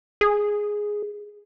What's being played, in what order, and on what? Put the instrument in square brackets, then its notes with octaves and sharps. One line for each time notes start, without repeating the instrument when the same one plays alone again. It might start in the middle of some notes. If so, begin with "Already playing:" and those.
[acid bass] G#4